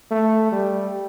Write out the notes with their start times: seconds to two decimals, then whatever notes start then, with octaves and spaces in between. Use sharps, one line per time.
0.11 A3
0.52 G3